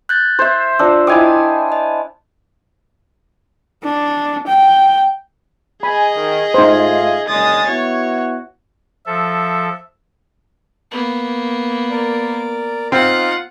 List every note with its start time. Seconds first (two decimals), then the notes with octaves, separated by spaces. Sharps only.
0.09 F#6 G6 A6
0.39 C5 E5
0.79 D4 F4 C5 E6
1.07 E4 D#5 G5 G#5 D6 D#6
1.72 D#5
3.84 D4
4.47 G5
5.83 G#4 D#5 G#5 B5
6.15 D#3
6.54 G#2 A3 D#4 F4 C5
7.28 F#1 D3 G#3 D#6 A6
7.67 B3 E4 F#4 C#5
9.07 F3 A4 E5
10.91 A#3 B3
11.91 A#4 D5
12.92 C4 D#4 F4 F5 F#5